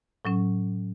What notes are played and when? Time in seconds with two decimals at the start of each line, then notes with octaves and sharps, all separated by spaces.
0.25 A2 F#3 C#4